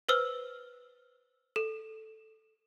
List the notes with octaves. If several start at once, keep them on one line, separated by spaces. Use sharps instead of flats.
B4 C5 E6 F6
A4